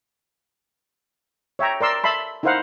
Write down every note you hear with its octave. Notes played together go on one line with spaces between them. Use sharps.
C#5 E5 G5 A#5
A#4 D5 C6 E6
E5 A5 B5 C6
D#4 E4 A#4 C5 F5 F#5